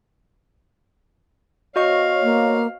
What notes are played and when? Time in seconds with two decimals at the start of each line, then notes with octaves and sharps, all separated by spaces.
1.76 B3 F#4 C5 C#5 D#5 F5 C#6
2.23 A#3